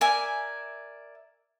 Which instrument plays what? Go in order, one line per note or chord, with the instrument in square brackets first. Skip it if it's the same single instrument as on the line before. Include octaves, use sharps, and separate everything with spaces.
[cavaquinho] A#4 D5 E5 G#5